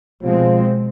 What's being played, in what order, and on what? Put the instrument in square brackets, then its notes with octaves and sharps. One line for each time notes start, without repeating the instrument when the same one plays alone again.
[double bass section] B2 G#3 C4 [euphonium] F3